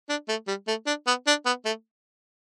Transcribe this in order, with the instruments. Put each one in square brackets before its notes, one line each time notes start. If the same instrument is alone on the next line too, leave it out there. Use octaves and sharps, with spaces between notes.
[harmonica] D4
A3
G3
A3
D4
B3
D4
B3
A3